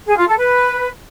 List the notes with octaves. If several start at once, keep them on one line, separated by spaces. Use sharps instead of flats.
G#4
F4
A4
B4